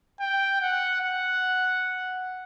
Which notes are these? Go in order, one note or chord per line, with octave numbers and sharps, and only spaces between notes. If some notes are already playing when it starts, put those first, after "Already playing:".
G5
F#5
F#5